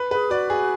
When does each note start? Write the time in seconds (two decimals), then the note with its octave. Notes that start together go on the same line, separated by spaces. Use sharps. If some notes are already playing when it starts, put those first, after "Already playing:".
Already playing: B4
0.11 G#4 B4
0.31 F#4 D5
0.50 G#4